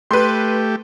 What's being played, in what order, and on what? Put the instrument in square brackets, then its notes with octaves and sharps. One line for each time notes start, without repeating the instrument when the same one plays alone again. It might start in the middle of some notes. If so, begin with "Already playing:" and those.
[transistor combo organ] A3 G4 [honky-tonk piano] B4 C6